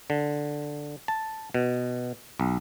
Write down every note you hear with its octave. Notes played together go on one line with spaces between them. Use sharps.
D3
A5
B2
B1